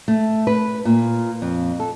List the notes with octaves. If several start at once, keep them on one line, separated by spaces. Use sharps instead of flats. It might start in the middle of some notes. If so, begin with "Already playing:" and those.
A3
B4
A#2
F2
A4